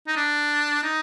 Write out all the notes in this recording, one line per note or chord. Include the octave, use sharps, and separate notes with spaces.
D#4
D4
D#4